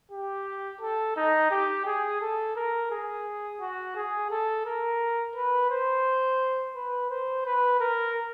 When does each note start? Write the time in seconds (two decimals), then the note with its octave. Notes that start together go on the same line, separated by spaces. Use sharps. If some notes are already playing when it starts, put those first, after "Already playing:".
0.11 G4
0.81 A4
1.16 D#4
1.51 G4
1.86 G#4
2.21 A4
2.56 A#4
2.91 G#4
3.61 F#4
3.95 G#4
4.31 A4
4.66 A#4
5.35 B4
5.70 C5
6.75 B4
7.10 C5
7.45 B4
7.80 A#4